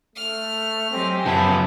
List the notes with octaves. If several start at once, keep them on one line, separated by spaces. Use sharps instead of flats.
A3 F6
F#3 G#3 C4 G4
F#2 C#3 F3 B3 E4 A5